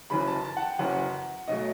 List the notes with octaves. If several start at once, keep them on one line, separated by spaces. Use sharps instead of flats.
F#1 F#2 E3 B5
A5
A5
F#5
G5
F#1 F#2 E3 F#5
B1 B2 F#3 A3 D#5